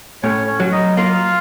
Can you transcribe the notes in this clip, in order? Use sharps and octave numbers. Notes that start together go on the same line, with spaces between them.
A2 C#4 C#5
C#4 C#5
F#3
D#4 D#5
A#3 F4 F5